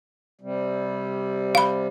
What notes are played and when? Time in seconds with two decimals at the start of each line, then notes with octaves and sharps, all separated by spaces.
0.41 C3 G3
1.55 F5 B5